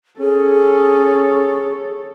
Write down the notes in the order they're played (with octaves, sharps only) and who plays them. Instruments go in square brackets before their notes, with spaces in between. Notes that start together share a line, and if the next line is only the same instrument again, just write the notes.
[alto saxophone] C#4 [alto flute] G#4 [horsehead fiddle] A4 C#5